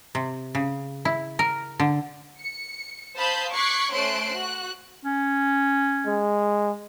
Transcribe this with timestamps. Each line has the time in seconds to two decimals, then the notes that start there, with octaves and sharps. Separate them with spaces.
0.15 C3
0.55 C#3
1.05 E4
1.39 A#4
1.80 D3
2.39 C#7
3.16 C5 F5 A5 B5 D#6 G6
3.51 C#6 D6 F#6 G#6 B6 C7
3.92 A3 C#4 C5 C6 F#6 D7
4.31 F#4 F#6
5.05 C#4
6.06 G#3